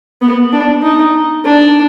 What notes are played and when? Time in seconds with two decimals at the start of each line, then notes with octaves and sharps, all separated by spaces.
0.22 B3
0.53 D4
0.83 D#4
1.45 D4